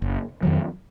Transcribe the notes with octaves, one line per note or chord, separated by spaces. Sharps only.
F#1
F2 D#3 F#3